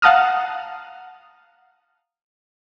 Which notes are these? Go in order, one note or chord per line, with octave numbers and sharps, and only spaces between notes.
F5 F#5 A5 A#5 D#6 F6